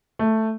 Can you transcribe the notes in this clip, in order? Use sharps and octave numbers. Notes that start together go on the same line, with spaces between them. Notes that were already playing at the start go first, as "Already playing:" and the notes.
A3